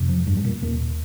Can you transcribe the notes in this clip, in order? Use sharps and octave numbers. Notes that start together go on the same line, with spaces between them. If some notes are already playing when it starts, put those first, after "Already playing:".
Already playing: F2 C3
F3
G2 G3
G3
A#2 A#3
D#2 A#2 A#3